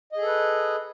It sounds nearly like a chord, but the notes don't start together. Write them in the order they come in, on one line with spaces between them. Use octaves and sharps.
D#5 G#4 A4 B4